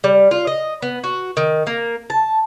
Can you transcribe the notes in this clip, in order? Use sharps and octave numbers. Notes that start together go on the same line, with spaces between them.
G3
F4
D#5
B3
F#4
D#3
A#3
A5